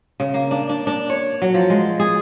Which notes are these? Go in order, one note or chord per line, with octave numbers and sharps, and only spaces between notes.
C#3
A#3
D4
D4
D4
C#5
F#3
F3
G#3
G#4